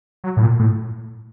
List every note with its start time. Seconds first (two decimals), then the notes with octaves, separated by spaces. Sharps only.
0.24 F#3
0.37 A2
0.43 A#2
0.59 A2